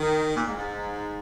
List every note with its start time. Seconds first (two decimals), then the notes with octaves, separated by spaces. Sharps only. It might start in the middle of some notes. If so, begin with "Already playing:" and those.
Already playing: D#3
0.37 A#2
0.48 G#2
0.58 G#2